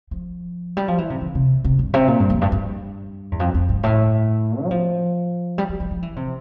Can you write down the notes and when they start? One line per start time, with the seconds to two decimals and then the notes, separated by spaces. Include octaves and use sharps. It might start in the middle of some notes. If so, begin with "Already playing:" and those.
0.11 F3
0.77 G3
0.88 F3
0.98 E3
1.10 C3
1.21 D3
1.35 C3
1.64 C3
1.79 G2
1.94 C3
2.08 A#2
2.20 G2
2.30 F2
2.41 G2
2.52 G2
3.32 E2
3.40 F2
3.54 F2
3.69 G2
3.83 A2
4.65 G3
4.71 F3
5.58 G3
5.69 F3
5.80 F3
5.91 F3
6.02 E3
6.16 C3